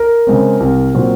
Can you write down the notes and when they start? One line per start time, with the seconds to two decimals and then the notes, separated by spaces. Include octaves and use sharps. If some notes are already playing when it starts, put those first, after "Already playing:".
Already playing: A#4
0.27 C#3 G#3 C4
0.60 C2
0.94 A#2 F#3 C4